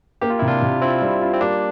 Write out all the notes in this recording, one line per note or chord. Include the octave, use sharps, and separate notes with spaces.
A#3 G4
F4
C3 E4
D4 F4
C3
C4 E4 F4
G3
F4
C4
G3 A#3 D4